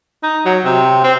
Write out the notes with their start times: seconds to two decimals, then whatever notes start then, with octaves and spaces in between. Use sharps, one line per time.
0.23 D#4
0.45 F#3
0.65 C3
1.04 C4